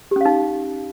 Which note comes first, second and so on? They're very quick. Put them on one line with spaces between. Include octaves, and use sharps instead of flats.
G4 C#4 F5 D#4